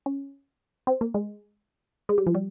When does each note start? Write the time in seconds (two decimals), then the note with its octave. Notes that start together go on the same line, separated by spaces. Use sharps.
0.06 C#4
0.87 C4
1.01 A#3
1.14 G#3
2.09 G#3
2.18 G3
2.26 F3
2.35 G3